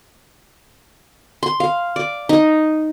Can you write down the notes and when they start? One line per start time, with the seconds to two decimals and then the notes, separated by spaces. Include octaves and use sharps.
1.43 C6
1.60 F5
1.96 D5
2.29 D#4